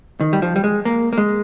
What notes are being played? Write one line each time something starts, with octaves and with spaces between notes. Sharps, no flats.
D#3
G3
F3
G3
G#3
A#3
A#3
G#3